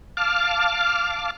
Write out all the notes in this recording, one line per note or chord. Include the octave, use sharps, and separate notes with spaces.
F5 A5 D6 F6